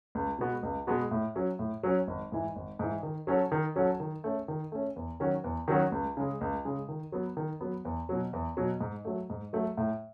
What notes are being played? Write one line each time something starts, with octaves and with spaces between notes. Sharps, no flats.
C#2
B2 G#3 B3 F#4
C#2
B2 G#3 B3 F#4
A2
F#3 C#4
A2
F#3 C#4
G#1
G#2 E3
G#1
G#2 E3
D#3
F#3 C#4 F#4 A4
D#3
F#3 C#4 F#4 A4
D#3
A3 C#4
D#3
A3 C#4
E2
D#3 F#3 C#4 F#4
E2
D#3 F#3 C#4 F#4
C#2
C#3 G#3
C#2
C#3 G#3
D#3
F#3 B3
D#3
F#3 B3
E2
B2 F#3
E2
B2 F#3
G#2
F#3 A3
G#2
F#3 A3
A2